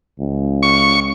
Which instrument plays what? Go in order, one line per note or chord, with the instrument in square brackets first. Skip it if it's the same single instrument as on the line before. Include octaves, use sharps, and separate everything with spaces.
[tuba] C#2
[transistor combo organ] C#6